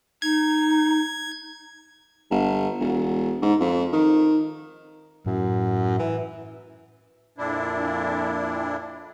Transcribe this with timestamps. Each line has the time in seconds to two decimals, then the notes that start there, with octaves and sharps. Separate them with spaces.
0.22 D#4 G#6
2.31 G1
2.80 E1
3.42 G#2
3.60 F2
3.93 D#3
5.26 F#2 A2
5.99 E3
7.38 F2 A#2 D4 E4